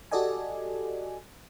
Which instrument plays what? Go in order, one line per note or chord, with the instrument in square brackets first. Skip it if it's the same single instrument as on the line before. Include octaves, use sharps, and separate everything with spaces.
[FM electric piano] F#4 G4 A4 D5 D#5 G#5